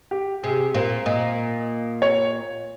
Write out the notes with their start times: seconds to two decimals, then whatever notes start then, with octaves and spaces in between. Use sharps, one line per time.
0.11 G4
0.43 C3 G#4
0.74 A#2 C5
1.06 A#2 D#5
2.02 C#5